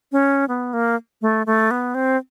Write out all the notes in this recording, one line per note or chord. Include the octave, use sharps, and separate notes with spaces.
C#4
B3
A#3
A3
A3
B3
C4